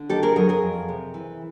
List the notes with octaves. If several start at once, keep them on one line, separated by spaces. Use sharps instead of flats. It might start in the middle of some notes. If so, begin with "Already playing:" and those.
Already playing: D3
D#3 G4 A4
G#4 A#4
F#3 G#4 A#4
G#4 A#4
F2
C3
E3